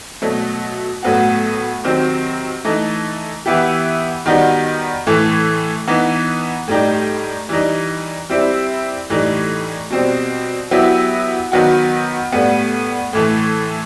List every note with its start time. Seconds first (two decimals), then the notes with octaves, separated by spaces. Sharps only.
0.22 B2 F#3 A3
1.03 A2 F#3 B3 F#4
1.84 C3 D#3 F#3 C4
2.64 E3 A3 D#4
3.46 E3 B3 E4 G4
4.26 D#3 G3 B3 D#4 F#4
5.07 A2 E3 A3
5.88 E3 B3 D#4
6.68 A2 G3 D#4 G4
7.49 E3 G3 D#4
8.30 G3 C4 E4 G4
9.10 A2 E3 G3 D#4
9.90 B2 G3 C4
10.71 F#3 B3 E4 G4
11.52 D#3 F#3 B3 F#4
12.32 A2 G3 B3
13.13 A2 E3 A3